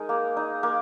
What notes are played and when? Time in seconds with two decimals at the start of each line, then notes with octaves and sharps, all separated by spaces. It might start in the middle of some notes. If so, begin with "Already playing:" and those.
Already playing: G#3 D#4 G#4 A#4
0.09 A#3
0.37 D#4
0.63 A#3